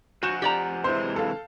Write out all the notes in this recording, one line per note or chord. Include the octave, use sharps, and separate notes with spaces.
F3 F#4 F#5 G#5 G6 E7
G4 D5 A#5
C3 E3 G#3 E4 C5
A4 F5